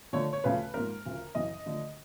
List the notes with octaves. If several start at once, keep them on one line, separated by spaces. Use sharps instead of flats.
D3 F3 A3 C#5
C#5
D2 C#3 F3 A3 B4
G#2 F3 A#3 A#4
D2 C#3 F3
F#2 C#3 E3 D#5
D3 F3 A3